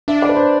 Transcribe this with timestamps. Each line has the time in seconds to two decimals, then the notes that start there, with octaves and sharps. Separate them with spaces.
0.08 D4 E5
0.22 D5
0.29 B4
0.36 C5